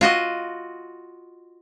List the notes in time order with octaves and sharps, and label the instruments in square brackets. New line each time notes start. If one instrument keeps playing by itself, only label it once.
[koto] F4 F#4 D#5